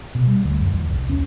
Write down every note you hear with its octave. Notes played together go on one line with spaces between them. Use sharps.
B2
G3
D2
F#2
E2
C2
C#4